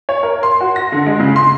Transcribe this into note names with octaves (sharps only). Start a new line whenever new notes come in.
C#5
A#4
C6
F#4
A#6
D3
G#3
C#3
C6